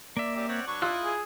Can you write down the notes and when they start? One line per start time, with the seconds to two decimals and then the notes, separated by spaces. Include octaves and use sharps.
0.17 A#3 D5 E5
0.36 C4 C#4 G4 D5
0.49 C4 C#5 D5 F#5
0.67 F#3 D4 B4 C#6
0.82 E4 F4 D#5 E6 F#6
1.03 G#4